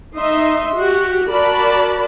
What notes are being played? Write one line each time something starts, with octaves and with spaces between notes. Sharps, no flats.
D#4 D#5 E5 C6
F#4 G4
F#4 A#4 D5 A5 B5